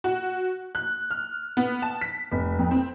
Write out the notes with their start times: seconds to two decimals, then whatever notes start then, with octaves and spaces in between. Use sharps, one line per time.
0.04 F#4
0.75 F#6
1.11 F6
1.57 B3
1.82 A5
2.01 B6
2.32 F1
2.59 F2
2.71 C4